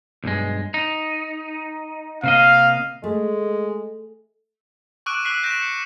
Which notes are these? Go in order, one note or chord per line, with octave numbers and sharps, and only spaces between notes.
B1 G2 G#3
D#4
C3 A#3 D#5 F5
G#3 A3
C#6 D6 E6 F#6 D7 D#7
D6 E6 F#6 B6 C7
F#6 G6 A#6 B6 D7 E7
C#7